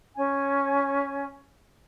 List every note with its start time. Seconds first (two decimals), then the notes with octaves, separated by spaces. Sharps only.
0.16 C#4 G#5